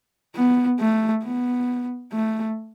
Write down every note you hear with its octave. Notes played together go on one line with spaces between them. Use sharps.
B3
A3
B3
A3